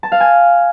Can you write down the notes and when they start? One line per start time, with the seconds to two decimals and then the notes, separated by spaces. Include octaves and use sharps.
0.03 A5
0.12 F5
0.20 G#5